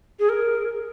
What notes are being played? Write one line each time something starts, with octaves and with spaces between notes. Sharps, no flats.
G#4
A#4